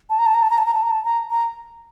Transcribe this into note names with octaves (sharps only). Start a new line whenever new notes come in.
A5
A#5
A5
A#5
A5
A#5
A5
A#5
A5
A#5
A5
A#5
A#5